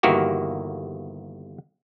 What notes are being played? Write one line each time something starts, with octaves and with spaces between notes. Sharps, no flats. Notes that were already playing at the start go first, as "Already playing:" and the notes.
G1 D#3 E3 A#3 F#4 G4